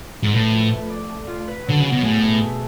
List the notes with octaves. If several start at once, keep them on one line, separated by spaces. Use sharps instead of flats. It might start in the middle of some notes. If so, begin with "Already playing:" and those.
G#2
A2 B4
F3
A3
D5
A3
F4
B4
D3 F#3
C#3 B3
B2
A2 G#4
B2
A3